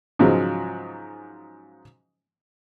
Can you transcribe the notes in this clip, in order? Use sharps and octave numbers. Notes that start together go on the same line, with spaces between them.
G#2 C#3 F3 F#3 G#3